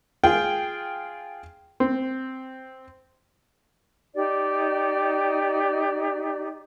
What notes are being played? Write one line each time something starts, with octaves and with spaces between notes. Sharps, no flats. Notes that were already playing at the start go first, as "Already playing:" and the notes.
F4 G#4 G5
C4
D#4 G4 D5